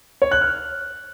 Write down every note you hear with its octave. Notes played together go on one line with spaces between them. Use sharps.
C#5
F#6
F6